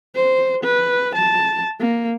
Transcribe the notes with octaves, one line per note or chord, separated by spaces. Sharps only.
C5
B4
A5
A#3